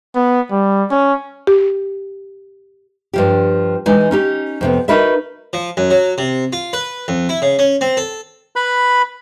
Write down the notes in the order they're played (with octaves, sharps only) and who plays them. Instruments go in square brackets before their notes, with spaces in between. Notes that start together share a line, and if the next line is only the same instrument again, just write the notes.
[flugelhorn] B3
G3
C#4
[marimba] G4
[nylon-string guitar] G2 F3 G4
E3 G#3 D#4 G#5
C#4 D#4 G4
F2 C3 B3
D#4 F#4 A#4 B4 D#5 E5
[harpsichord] F3
F#2
F#3
C3
F4
B4
F2
E4
C#3
C#4
C4
A4
[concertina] B4 B5